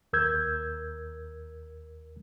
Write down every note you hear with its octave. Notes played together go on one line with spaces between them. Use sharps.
D#2 A#4 E6 G6 G#6